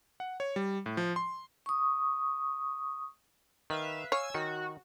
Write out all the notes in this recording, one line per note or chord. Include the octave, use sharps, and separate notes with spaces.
F#5
C#5
G3
A2
F3
C6
C#6 D#6
D#3 B4 E5 F5
C#5 F5 G#5 E6
D#3 F#4